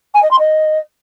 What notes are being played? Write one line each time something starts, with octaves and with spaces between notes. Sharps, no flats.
G#5
D#5
C6
D#5